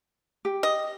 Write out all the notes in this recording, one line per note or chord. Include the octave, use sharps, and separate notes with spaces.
G4
D#5